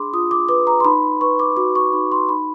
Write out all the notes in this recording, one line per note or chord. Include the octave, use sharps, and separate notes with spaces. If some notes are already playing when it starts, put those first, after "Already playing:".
Already playing: D4 G#4 B5 C6 D6
F4 D#6
D6
B4 D6
A#5
C6
D#4 B5
B4 C#6
D6
F#4 D6
C#6
D#4 B5
C6
D#4 B5